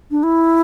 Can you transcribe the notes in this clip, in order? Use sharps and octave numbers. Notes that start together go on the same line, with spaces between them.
D4
E4